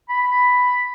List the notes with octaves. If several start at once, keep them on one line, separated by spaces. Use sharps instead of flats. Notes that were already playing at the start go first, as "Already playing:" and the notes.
B5